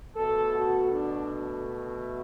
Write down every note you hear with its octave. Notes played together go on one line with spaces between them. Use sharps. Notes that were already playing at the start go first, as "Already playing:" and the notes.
B2 A3 A4
F#4
D4